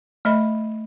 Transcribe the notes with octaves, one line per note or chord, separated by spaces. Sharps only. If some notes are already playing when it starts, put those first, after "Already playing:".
A3 D#5 B5